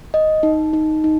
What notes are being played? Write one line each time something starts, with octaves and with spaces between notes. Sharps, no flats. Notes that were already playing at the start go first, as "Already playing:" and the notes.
D#5
D#4
D#4
D#4